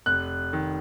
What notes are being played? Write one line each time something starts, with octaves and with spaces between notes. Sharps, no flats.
F1 F#6
D#3